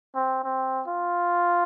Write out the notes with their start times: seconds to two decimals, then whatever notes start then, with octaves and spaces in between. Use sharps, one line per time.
0.15 C4
0.44 C4
0.88 F4